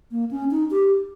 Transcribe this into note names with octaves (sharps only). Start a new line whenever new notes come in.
A#3
C#4
D#4
G4